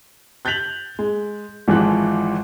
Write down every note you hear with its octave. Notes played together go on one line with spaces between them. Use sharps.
F#6 G6 A6 B6 F7 F#7
G#3
G#1 G#2 E3 F3 F#6